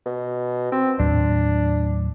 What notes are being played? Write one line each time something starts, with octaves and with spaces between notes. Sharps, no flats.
B2
C4
D#2 A2 F#3 D4